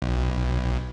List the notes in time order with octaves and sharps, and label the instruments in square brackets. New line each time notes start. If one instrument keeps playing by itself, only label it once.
[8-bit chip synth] B1